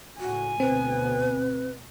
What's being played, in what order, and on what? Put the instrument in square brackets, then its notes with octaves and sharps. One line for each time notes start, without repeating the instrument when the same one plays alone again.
[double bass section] C#2 A2 [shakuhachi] F#4 [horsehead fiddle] G#5
[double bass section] D2 B2 B3 [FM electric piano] C4 [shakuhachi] B4